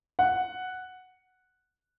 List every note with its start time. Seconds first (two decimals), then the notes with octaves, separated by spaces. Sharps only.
0.19 F#5